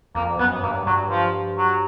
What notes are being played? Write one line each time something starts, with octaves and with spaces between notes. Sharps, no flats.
F2 A#3
F#2 B3
G2 A#3
G2 F#3
F3
F#3